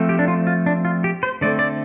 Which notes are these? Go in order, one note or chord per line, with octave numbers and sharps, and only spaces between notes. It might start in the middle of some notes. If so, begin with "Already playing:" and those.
Already playing: F3 A3 C4
G4
D4
F4
F4
D4
F4
G4
C5
D3 A3 C4 D5
D5